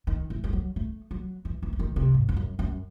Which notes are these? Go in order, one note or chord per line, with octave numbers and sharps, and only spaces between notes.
D#3
E3
G#3
F#3
A3
F#3
E3
E3
E3
D#3
C3
G#2
E2
F#2
F#2